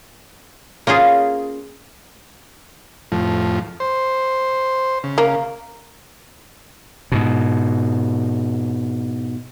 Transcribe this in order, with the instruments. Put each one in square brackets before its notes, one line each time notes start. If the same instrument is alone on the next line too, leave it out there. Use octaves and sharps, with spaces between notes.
[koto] A#3 C#4 F4 G#4
[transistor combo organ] F2 A2 F3
C5
C#3
[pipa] A#3
[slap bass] G#2 B2